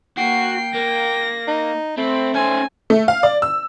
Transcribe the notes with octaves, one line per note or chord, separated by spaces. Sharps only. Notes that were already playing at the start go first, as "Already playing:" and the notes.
A#3 F#4 G5 C7
A#3 A#6
D#4
A3 C4 B5
C#4 C5 G#5
A3
F5
D5
E6